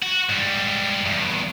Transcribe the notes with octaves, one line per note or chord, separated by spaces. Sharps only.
F#4
G#2 G3
E2 G2